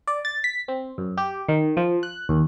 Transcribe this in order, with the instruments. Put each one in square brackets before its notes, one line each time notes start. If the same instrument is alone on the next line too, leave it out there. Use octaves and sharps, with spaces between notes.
[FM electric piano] D5
A6
B6
C4
F#2
G4
D#3
F3
F#6
D#2